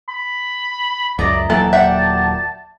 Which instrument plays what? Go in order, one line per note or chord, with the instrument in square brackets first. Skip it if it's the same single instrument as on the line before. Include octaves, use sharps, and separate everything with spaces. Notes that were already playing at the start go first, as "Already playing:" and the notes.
[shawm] B5
[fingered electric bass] C#2 F#2 [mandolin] E4 D#5 A#5 [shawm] D5
[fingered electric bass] D#1 F#3 A#3 [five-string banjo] E3 A4 [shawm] A5
[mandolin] D5 F#5 G5 [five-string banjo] E5